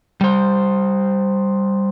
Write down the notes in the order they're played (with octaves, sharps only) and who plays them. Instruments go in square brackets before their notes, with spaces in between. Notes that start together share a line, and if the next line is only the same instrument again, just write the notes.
[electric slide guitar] G3 C5